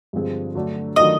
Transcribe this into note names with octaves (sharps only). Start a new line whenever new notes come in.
G2 D3 F3 G#3 C4
D3 F#3 A3 D4
D#3 F#3 A3 D4 F4 D#5